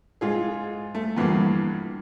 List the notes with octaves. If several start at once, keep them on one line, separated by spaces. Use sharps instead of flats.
G#2 F4 G#4
A3
E2 G2 D3 F3 A#3